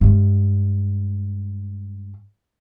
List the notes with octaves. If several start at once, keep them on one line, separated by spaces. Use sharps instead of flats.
G2 G#3